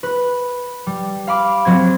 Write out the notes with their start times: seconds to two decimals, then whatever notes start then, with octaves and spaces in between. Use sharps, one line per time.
0.03 B4
0.87 G3
1.27 F5 B5 D6
1.65 F#3 C4 G#6